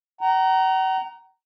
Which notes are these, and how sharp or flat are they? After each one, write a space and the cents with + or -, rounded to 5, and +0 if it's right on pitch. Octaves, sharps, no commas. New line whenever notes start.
F#5 +45 A#5 +0